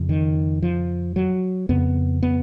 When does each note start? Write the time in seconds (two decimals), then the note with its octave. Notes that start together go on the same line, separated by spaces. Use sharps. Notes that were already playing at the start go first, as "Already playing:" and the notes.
Already playing: F2 C#3
0.09 D#3
0.62 F3
1.16 F#3
1.69 F2 C#3 B3
2.23 B3